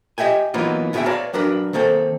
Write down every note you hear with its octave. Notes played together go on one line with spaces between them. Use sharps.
G4 D#5 E5 G5 G#5
E3 F#3 A#3 B3 D#4 F4
D2 B2 F4 G#4 E5 G5
B4 C#5 D5 F5 A5 A#5
F#3 D4 A#4 B4
D#3 A#3 C4 A4